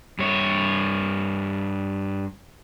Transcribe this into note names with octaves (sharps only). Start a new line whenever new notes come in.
G2 C#5